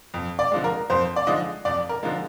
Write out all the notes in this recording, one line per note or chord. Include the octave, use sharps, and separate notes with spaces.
F2
D5
D3 F3 G#3
A#4
F2 C5
D5
D3 F3 G#3 D#5
F2 D5
A#4
D3 F3 G#3